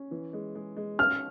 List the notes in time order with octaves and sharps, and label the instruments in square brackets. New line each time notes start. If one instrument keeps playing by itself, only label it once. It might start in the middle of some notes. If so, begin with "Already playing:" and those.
Already playing: [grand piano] C#4
E3
G#3
G#3
G#3
[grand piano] C#4 [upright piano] F6